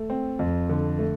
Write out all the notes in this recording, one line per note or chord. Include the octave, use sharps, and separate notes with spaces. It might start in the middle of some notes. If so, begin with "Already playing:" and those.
Already playing: A3
C4
F2
D3
A3